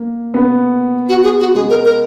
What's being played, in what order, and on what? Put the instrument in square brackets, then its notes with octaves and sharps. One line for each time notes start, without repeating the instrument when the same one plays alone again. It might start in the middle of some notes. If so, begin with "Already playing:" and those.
Already playing: [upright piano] A#3
B3
[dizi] F#4
G#4
F#4
[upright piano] G#3 [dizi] G#4
[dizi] A#4
A#4